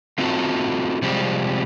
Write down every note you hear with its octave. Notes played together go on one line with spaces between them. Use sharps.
A3 C4 D#4 F4 F#4 A4
C3 F3 G3 G#3 C4